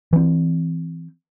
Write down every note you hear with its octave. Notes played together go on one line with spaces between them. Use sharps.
E3 C4